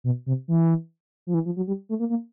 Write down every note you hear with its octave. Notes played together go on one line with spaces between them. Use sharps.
B2
C3
E3
F3
E3
F3
F#3
G3
A3
A#3
A#3